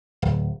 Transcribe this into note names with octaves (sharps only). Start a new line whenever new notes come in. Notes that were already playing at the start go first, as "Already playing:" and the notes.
D1